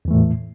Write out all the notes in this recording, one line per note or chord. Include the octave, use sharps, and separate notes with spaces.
E2 A2 E3 A3